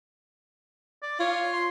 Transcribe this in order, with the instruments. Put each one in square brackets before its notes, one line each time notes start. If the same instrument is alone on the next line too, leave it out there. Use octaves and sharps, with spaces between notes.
[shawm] D5
[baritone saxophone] F4 [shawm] C#5
[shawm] C6